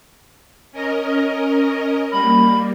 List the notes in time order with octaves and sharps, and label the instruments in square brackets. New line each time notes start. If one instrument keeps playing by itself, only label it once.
[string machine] C#4 A#4 D#5
[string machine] G3 A#3 [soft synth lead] B5